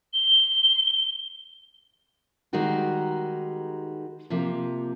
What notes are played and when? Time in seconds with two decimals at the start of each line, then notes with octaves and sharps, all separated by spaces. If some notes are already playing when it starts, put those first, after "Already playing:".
0.14 G7
2.53 D#3 G3 G#3 D#4 F#4 A#4
4.30 C3 F3 A#3